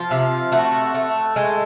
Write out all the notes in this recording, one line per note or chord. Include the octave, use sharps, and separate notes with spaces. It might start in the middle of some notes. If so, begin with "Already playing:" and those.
Already playing: F3 F4
C3
A3 F#4
A3
G#3